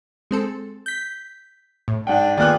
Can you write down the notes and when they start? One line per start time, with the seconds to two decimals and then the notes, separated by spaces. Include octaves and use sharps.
0.31 G#3 C4 A4
0.86 G6 B6
1.88 A2
2.07 G#2 D4 F#5 G5
2.37 D#3 A#3 B3 F4 G4 G#4 D5 F#6